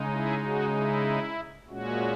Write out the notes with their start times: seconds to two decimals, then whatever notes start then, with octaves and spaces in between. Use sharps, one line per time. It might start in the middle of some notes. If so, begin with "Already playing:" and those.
Already playing: C#3 G#3 D#4
0.12 E4 G#4
0.44 F#4
0.75 E4
1.68 A#2 G#3 C#4 F#4